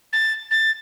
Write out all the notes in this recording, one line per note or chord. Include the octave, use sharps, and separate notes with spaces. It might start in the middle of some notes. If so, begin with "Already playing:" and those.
A6
A6